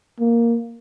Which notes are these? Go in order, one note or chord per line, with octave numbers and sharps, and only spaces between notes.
A#3